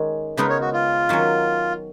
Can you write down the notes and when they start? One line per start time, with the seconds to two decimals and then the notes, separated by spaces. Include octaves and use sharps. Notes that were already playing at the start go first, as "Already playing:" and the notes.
Already playing: D#3 G#3 C#4
0.37 C#3 G#3 B3 D#4 A#4 B4
0.49 C#5
0.61 F#4
0.73 F4
1.09 D#3 F#3 C#4